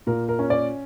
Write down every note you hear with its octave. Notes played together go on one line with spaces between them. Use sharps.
A#2 A#4
A#4
C#4
D5